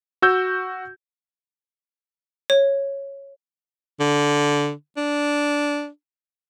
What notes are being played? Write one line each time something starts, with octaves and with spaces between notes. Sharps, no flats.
F#4 E6 G6
C#5
D3
D4